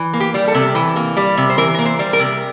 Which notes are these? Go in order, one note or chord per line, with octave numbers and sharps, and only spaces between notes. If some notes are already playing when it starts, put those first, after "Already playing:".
Already playing: E3
A#3
G4
G3
A4
C3
E3
A#3
G3
C3
C5
E3 A#4
A#3 A#4
C5
G3
A#4
C3